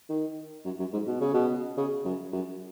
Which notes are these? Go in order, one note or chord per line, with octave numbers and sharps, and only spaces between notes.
D#3
F#2
F#2
G#2
B2
C#3
B2
C#3
F#2
F#2